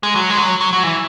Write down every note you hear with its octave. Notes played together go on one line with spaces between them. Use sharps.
G#3
F#3
G#3
F#3
F#3
F#3
E3